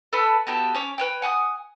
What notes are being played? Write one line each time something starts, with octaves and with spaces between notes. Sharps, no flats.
A4 B4 A5 B5
B3 F#4 G4 A4
C#4 C#5 D6
B4 C#5 G5
F#5 G#5 C#6 D#6